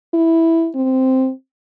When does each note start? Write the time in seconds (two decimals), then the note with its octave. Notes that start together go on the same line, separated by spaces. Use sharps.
0.14 E4
0.75 C4